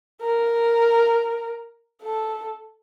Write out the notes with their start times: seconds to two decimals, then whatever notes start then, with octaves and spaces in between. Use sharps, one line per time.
0.21 A#4
2.02 A4